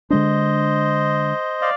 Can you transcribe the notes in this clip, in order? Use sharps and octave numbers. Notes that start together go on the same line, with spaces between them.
D3 G#3 D4 C5 D#5
D5 F5